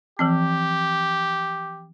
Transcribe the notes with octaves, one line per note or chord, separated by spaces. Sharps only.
E3 F3 C4 G4